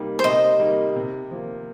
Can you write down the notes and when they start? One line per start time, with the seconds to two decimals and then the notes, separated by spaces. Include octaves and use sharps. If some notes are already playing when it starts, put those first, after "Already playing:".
Already playing: C3 G3 A#3 D#4
0.19 C5
0.24 C3 D#5
0.60 G3 A#3 D#4
0.96 C3
1.31 F3 A#3